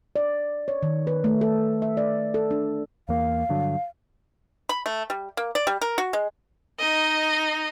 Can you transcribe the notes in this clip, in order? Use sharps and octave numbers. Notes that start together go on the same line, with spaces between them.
D5
C#5
D#3
B4
A3
A4
E5
D5
A4
D4
E2 A#3 F5
G2 D3 F#3
B5
A3
G3
A#3
D5
G3
A#4
F#4
G#3
D#4 D#5